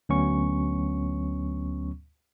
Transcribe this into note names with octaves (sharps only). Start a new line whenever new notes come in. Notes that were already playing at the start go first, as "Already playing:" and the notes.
D2 F#3 B3 C#4 C#6